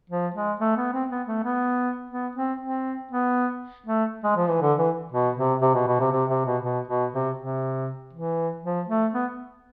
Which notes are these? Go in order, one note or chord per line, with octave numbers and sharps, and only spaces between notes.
F3
G#3
A3
B3
C4
B3
A3
B3
B3
C4
C4
B3
A3
G#3
F3
E3
D3
E3
B2
C3
C3
B2
B2
C3
C3
C3
B2
B2
B2
C3
C3
E3
F3
A3
B3